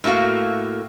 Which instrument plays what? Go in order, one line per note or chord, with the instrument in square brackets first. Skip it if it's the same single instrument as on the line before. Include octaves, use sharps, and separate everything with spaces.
[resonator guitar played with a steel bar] A2 A3 A#3 F#4 F5